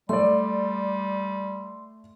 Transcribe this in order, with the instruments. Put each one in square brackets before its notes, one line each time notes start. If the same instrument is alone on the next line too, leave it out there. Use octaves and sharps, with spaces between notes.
[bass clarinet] G3 [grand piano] A3 D5 [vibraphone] C6